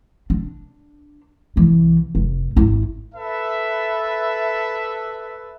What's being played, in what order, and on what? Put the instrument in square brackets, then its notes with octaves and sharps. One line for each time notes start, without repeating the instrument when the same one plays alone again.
[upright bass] D4
C2 E3
F1
G#1 E4
[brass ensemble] A4 B4 E5